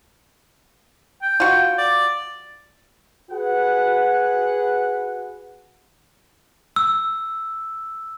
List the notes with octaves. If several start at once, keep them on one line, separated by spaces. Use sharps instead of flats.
G5
F4 F#4
D5
F#4 G#4 B4 F#5
E6